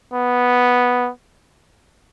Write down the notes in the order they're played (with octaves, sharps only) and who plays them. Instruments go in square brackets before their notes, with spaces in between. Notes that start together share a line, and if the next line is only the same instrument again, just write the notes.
[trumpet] B3